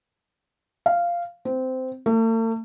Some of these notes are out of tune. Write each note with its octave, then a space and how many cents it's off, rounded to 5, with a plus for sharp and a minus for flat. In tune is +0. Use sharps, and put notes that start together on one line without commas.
F5 -10
C4 -15
A3 +45